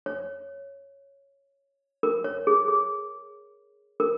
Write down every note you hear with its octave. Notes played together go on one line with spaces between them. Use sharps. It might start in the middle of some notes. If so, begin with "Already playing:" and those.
C#5
A#4
C#5
G#4
G#4
A#4